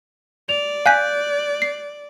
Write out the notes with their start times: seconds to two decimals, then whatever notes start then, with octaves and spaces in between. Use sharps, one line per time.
0.49 D5 F7
0.86 F5 G#5 F#6 G6 B6
1.62 C7